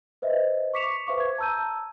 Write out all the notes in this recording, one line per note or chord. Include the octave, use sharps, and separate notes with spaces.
B4 C5 D#5 E5
C#6 D6 B6 C#7 E7 F7
B4 C5 E5 F5 C#6 D6
G#6
A5 A#5 E6 G6 D#7